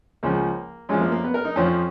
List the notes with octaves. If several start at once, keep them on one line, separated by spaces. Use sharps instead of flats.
C#2 C#3 F3 A#3
F#2 F3 G#3
A#3
A#3
B3
A#4
D#4
F2 F3 C#4